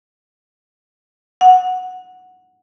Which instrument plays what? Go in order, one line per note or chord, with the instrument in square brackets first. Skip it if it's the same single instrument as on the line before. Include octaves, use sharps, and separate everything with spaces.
[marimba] F#5